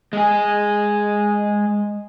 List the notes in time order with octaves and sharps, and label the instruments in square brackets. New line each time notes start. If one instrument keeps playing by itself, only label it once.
[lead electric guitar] G#3 G#4